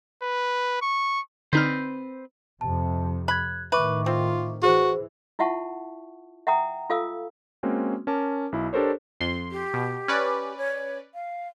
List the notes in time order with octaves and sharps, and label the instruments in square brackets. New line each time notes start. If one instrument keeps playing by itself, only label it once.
[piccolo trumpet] B4
C#6
[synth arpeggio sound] D3 D#4 F6 [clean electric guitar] C4 B4 C5
[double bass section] F2 C3 [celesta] A5
[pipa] B5 [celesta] F#6 G#6
[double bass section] A2 D#3 [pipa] B4 [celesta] E5 C#6 D6
[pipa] C4 [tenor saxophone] F4
[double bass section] E3 [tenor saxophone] F#4 [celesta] G#4 C5
[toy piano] E4 F4 E5 F#5 A5 C#6
E5 F#5 G5 A#5 D#6
F4 A4 F5 D#6 E6
[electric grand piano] G#3 A#3 C4 C#4 F#4
C#4 A#4 A5 D6
B1 E4
D4 G4 A4 A#4 C5 C#5
[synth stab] F2 C6
[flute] G4
[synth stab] B2
C#4 B4 D5
[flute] C#5
F5